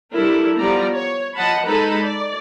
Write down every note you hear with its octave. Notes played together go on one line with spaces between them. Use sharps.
G3 D4 E4 A4 A#4
F3 G3 B3 D5 A#5
C#5
F3 D#5 F#5 A5 B5
G#3 D#4 A4 B4 A#5 B5
D5